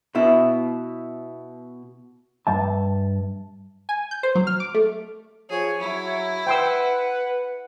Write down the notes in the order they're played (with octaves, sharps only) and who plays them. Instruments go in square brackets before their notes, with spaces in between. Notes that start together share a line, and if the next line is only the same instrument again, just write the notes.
[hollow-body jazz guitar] B2 E4
[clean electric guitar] G2 E5 A5
[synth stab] G#5
G6
C5
F#3
F6
D6
A3
[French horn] F3 [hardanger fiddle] G#4 [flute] C#5
[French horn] F#3 [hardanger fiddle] E4
[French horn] B4 [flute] F#5 [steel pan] G5 C6 E6